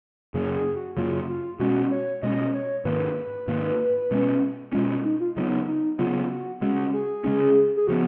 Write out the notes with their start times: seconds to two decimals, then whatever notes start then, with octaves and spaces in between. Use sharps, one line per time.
0.34 F#2 C#3 F#3 A#3 G#4
0.55 G#4
0.76 F#4
0.97 F#2 C#3 F#3 A#3 F4
1.29 F4
1.59 B2 G#3 C#4 F#4
1.91 C#5
2.22 B2 G#3 C#4 D#5
2.54 C#5
2.85 G#2 D#3 A#3 B4
3.48 G#2 D#3 A#3
4.11 B2 G#3 C#4
4.73 B2 G#3 C#4 F4
5.04 D#4
5.20 F4
5.36 C#3 F#3 B3 D#4
5.67 D#4
5.99 C#3 F#3 B3 F4
6.30 F#4
6.61 C#3 G#3 C#4 F#4
6.93 G#4
7.24 C#3 G#3 C#4
7.77 G#4
7.87 C#3 F3 B3 F#4